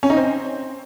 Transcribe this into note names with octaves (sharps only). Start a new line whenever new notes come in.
C#4
D#4
C4